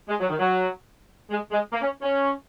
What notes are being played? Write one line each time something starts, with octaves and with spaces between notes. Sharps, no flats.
G#3
F#3
D#3
F#3
G#3
G#3
A#3
C#4
C#4